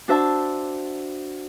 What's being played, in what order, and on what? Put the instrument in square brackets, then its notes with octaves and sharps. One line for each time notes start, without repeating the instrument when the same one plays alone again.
[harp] D4 F#4 C5 E5 A5